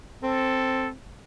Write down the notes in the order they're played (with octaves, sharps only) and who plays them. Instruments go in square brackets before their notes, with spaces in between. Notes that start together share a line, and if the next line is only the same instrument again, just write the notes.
[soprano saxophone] C4 [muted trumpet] A4